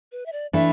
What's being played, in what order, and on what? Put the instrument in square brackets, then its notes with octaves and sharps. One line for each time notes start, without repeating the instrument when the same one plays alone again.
[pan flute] B4
E5
D5
[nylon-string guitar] E3 A3 D4 [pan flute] E5